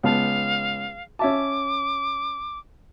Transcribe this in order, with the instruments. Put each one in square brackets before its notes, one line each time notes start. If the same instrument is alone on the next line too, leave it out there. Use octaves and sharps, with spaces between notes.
[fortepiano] C#2 B3 A5 [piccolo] F5
[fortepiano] C#4 E5 A5 [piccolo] D6